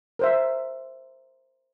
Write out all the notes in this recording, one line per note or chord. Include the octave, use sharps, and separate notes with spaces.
A#4 C5 E5